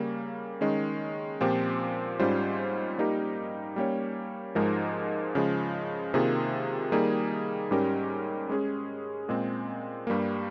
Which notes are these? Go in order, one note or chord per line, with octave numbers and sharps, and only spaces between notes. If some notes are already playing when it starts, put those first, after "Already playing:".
Already playing: C#3 G3 A#3
D#3 G#3 C#4
A#2 F3 C4 G4 C5
G#2 G3 C#4 F4 C5
G3 A#3 D#4 G4 A#4
G3 A#3 C#4 G4 C#5
G#2 F3 G#3 D#4 A#4
C#3 F3 G#3
C3 D#3 A#3 F4 G#4
D#3 G3 A#3 D#4 G#4
G#2 G3 C#4 G4 A#4
G#3 C#4 G#4
A#2 G#3 C4
G2 G3 A#3